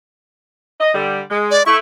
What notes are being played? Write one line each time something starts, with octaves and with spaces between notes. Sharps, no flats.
D#5
D3 G3
G#3
D5
A3 E4 C#6